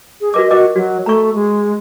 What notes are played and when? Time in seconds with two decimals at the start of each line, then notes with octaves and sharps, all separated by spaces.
0.21 G#4
0.34 F#4 A#4 D#5 D6
0.51 F#4 A#4 D#5 D6
0.76 F#3 F#4
1.06 A3 A#5 C#6
1.35 G#3